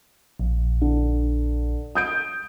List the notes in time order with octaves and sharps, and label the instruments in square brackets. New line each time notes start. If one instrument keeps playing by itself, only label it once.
[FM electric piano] A#1
[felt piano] D3
D#6 G6 D7